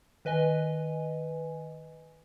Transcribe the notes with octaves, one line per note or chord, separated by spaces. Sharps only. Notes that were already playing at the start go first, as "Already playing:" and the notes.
D#3 B4 D#5 G#5